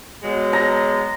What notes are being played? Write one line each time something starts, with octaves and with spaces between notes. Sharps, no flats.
B2 F#3 G#3
A#5